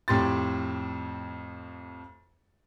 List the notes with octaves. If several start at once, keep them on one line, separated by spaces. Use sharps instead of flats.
F2 A2 G4 C6 A6